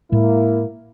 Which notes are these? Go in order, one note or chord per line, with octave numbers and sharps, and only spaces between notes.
A2 G#3 A#3 E4